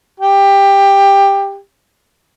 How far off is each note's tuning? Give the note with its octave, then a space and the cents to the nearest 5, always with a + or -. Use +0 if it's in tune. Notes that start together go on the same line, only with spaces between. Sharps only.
G4 +15